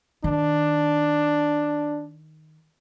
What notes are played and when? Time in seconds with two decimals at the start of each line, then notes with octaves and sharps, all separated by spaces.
0.24 D#3 D4